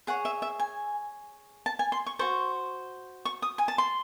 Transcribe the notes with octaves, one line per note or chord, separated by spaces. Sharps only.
G#4 C#5 F#5
E5
E5
G#5
A5
G#5
C6
C#6
F#4 A4 C5 C#6
C#6
D#6
G#5
A5
C6